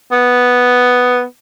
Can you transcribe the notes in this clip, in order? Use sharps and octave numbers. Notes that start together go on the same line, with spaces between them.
B3